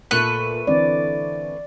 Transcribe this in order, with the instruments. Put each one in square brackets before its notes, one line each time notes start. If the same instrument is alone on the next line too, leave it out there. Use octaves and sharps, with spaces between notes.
[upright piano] A#2 G7 [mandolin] A3 B4 F#6
[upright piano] D3 E3 C4 [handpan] D5